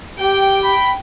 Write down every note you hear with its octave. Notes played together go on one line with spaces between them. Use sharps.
G4 G5
B5